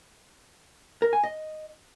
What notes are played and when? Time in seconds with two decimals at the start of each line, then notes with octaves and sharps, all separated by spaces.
1.02 A#4
1.13 G#5
1.23 D#5